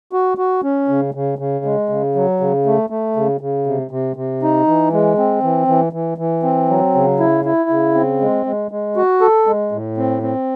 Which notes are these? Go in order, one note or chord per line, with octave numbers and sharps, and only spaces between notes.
F#4
F#4
C#4
C#3
C#3
C#3
G#3
C#3
F#3
C#3
A3
A3
C#3
C#3
C3
C3
C3
D#4
E3
G#3
C4
E3
E3
E3
E3
C4
F#3
C#3
E4
E4
C#3
C4
G#3
G#3
G#3
F#4
A4
G#3
A2
C4
C4